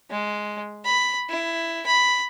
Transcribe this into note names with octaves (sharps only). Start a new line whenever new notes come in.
G#3
B5
E4
B5